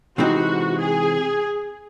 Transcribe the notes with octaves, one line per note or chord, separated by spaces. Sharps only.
C3 E3 G#3 C4 D#4 F#4
G#4